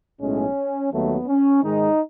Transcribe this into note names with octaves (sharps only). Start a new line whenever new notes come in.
B1 A2 G#3 C#4
D#2 D#3 F#3 A3 B3
C#4
G#2 D#3 G#3 D#4